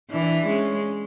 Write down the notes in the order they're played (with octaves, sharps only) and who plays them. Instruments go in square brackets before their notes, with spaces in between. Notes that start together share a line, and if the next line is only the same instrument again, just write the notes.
[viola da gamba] E3 [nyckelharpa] D4
[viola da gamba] G#3 [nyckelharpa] C#4